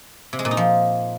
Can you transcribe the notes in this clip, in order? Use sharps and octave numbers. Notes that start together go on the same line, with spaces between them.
C3
G#3
A#2
D#4
F3